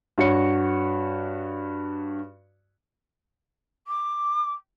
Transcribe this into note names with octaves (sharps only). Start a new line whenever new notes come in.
G2 F#4 C#5 C#7
D6